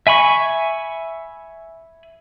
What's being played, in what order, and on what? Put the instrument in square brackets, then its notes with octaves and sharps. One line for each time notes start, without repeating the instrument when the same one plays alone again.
[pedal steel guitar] E5 G#5 B5 C#6